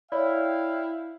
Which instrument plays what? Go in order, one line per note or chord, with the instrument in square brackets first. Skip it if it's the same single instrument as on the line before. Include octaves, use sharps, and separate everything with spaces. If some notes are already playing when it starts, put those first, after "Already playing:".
[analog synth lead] E4 [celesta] C#5 D5 [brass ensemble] F5 G5